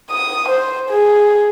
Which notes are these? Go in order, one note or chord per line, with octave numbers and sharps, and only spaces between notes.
D#6
C5
G#4